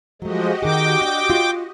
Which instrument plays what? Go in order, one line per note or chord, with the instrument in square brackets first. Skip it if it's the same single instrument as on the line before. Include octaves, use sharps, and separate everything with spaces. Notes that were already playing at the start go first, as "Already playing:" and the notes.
[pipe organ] F3 G#3 [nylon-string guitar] F#3 A3 [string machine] F#4 G4 D#5
[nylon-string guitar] D#3 G#4 [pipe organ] G5 D6
[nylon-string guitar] D4
F4